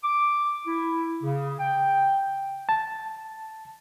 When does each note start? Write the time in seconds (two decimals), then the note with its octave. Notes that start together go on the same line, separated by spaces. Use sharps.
0.03 D6
0.67 E4
1.23 C#3
1.59 G5
2.69 A5